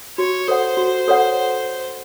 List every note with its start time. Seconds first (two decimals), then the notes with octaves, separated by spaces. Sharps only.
0.18 F#4 C#5
0.47 A4 C5 C#5 F#5
0.77 F#4
1.08 A4 C#5 F#5